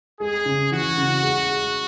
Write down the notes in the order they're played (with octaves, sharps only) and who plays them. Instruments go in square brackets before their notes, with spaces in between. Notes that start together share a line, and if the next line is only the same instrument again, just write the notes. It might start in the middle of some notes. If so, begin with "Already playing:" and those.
[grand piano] G#3 [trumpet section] G#4
[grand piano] C#3
[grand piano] E3 [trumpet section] F#4
[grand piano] C#3
G#3
G#3